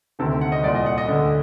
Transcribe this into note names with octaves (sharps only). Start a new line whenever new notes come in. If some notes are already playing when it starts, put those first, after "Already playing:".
D2 C3 D#3 A4
F#5
D#5
C2 A#2 D5
D#5
F#5
D#5
D2 D3